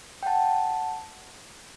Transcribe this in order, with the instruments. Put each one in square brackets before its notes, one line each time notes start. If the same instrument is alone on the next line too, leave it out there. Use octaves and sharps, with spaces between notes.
[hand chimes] G5
F#5 A5